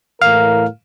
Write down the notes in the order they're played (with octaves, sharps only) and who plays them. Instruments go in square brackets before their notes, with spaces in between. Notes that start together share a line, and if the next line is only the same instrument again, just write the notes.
[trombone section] A2 E3 A#4 [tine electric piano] F5 F6